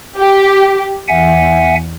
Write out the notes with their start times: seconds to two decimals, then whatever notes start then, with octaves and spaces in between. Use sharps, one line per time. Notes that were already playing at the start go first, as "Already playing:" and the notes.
0.18 G4
1.08 E2 E5 F#5 G#5